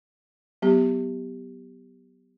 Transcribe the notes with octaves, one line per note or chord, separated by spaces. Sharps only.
F#3 B3 G4